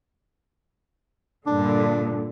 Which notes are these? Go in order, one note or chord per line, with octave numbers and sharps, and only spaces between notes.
G2 A#2 D3 D4